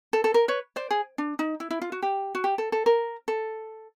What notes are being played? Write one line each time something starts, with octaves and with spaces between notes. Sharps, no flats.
A4
A4
A#4
B4 C#5
C5 D5
G#4
D4
D#4
E4
E4
F4
F#4
G4
F#4
G4
A4
A4
A#4
A4